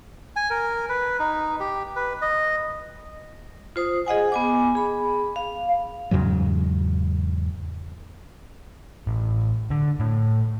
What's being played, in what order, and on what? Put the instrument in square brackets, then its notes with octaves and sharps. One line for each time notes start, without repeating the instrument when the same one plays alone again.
[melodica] G#5
A#4
B4
D#4
G4
B4
D#5
[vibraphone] F4 C5 D#6
G#4 D#5 F#5 G#5
B3 G#5 D6
G#4 B5
F5
[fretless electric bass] E2 G#2 C#3 F#3
[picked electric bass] A1
D3
A2